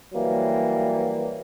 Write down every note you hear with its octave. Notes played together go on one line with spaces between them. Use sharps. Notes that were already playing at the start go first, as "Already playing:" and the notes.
E3 F#3 G3 A#3